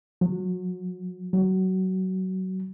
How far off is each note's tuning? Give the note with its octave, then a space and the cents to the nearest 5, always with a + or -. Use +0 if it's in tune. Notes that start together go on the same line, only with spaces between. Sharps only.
F#3 -25
F#3 +20